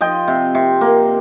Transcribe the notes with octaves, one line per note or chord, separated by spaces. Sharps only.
F3 D#5 G5
C3
C3
A#3